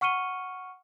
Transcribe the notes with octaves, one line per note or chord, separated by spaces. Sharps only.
F#5 C#6 F6 C#7 D#7 G7